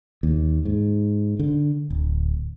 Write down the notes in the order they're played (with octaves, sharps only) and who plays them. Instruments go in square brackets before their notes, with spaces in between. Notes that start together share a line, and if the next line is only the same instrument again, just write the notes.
[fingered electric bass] D#2
G#2
D3
D1